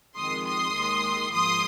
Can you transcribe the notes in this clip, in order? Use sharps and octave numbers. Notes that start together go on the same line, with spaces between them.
F2 D#3 G#3 C6 D#6
C6 D#6
D#2 D#3 G#3
G#2 F3 A#3 C6 D#6